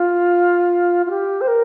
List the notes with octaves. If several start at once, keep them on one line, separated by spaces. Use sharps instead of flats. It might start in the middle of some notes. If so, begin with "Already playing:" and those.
Already playing: F4
F4
G4
C5
A#4